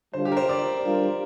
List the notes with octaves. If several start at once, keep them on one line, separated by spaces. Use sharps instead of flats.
D3 G3 D4 F4 C5
G4
A#4
C5
D5
G3 D4 F4 A#4